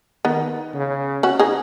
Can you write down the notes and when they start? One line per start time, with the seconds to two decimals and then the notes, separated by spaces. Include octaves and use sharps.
0.25 D#3 B3 D#4
0.74 C#3
1.23 C#4 F#4
1.39 D#4 G#4